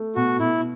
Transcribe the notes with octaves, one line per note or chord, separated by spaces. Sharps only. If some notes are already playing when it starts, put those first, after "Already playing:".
Already playing: A3
B2 F#4
B2 E4